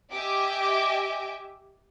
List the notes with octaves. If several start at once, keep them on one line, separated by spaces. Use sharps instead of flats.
G4 D#5 E5 G5 G#5 D6